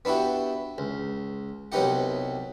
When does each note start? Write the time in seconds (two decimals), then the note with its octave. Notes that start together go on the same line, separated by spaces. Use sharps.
0.05 B3 D4 E4 F#4 G4
0.78 C#2
1.72 C2 F#3 B3 D#4 G4 F#5